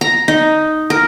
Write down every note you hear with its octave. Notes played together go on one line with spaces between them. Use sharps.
A#5
D#4
A#4